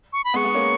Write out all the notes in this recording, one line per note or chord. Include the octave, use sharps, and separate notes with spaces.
C#6
B5
G#3 B3 C#6
G#3 B3
A#3 C#4